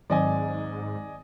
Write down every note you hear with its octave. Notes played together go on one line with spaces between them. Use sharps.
G#2 D#3 F#3 C4 D5 D#5 G#5